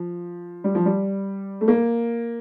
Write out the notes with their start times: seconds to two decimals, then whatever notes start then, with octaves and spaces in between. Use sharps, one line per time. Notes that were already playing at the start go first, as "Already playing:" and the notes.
Already playing: F3
0.64 G3
0.75 F3
0.86 G3
1.61 A3
1.68 A#3